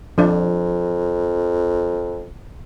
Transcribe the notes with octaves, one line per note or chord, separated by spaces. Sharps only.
F2 F3 D4